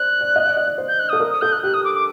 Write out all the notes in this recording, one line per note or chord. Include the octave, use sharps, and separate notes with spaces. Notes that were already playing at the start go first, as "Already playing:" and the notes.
Already playing: C5 D5 F#6
D5
D#5
D5
D#5
D5
C5
G6
F#6
A4 D#6
A#4
D#6
A4 G6
F#6
G4 F#6
D#6
D6
D6